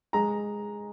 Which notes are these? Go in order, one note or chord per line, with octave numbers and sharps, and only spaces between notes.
G#3 A#5